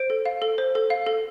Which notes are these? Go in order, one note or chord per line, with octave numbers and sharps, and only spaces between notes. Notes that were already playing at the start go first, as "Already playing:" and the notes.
Already playing: C5 D7
A4
F5
A4
C5
A4
F5
A4